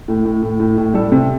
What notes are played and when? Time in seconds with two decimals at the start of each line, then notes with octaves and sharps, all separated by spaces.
0.08 A2
0.25 A2
0.42 A2
0.60 A2
0.78 A2
0.94 G3 A4
1.12 C3